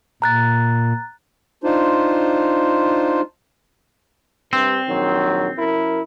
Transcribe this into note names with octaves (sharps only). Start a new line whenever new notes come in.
A#2 A#5 F#6 A6
D4 D#4 F4 C5
G2 C4
A#1 D#3 F#3
F#2 E4 A#4